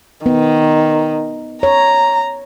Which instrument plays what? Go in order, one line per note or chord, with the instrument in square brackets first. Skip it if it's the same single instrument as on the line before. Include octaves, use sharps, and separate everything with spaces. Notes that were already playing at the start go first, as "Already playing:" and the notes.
[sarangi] D#3 [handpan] B3
[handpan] C#5 [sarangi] A#5